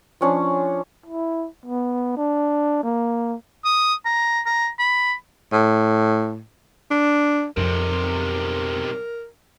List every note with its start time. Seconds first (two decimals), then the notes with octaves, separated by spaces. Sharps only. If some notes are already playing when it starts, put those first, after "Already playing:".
0.21 F3 C#4 D4
1.06 E4
1.66 B3
2.17 D4
2.83 A#3
3.65 D#6
4.06 A#5
4.46 A#5
4.79 B5
5.52 A2
6.91 D4
7.57 B1 F2 C3 A#4